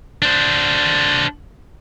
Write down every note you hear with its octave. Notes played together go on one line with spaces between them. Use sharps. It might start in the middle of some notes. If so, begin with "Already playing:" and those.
D4 C5